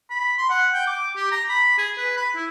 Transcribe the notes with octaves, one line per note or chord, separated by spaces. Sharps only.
B5
C6
F#5
G5
D6
G4
A#5
B5
G#4
B4
B5
E4